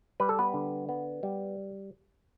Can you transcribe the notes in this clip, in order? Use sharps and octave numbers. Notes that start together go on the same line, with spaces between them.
G3 B4
A4
B3 B4
D3
B3
G3